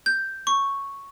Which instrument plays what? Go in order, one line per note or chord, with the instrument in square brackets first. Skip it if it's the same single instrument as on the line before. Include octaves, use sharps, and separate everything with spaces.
[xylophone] G6
C#6